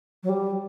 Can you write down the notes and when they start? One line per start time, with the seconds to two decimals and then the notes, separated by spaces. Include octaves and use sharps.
0.23 F#3
0.29 G3